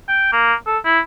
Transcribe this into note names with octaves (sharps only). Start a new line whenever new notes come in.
G5
A#3
A4
E4